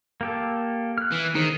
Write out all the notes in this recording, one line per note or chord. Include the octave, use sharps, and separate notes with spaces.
A#3 G4 A4
F6 F#6
E3
D#3 D#4 G#4 C5